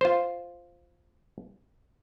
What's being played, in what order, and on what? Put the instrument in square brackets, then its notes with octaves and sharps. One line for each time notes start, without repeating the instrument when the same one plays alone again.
[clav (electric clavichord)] F4 C5